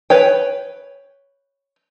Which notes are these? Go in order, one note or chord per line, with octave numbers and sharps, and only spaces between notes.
B4 C#5 G5